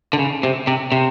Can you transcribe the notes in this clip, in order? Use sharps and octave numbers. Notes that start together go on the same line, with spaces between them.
D3
C#3
C3
C3
C3